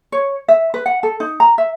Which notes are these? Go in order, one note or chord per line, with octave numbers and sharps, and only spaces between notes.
C#5
E5
B4
F#5
A4
D#4
A#5
E5